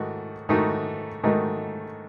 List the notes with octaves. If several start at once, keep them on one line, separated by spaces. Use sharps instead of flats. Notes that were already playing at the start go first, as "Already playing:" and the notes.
Already playing: G#2 D#3 A3 F#4
G#2 D#3 A3 D#4 F#4
G#2 D#3 A3 D#4 F#4